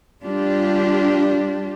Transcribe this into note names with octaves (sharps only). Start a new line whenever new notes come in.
G3 D4 F4 G4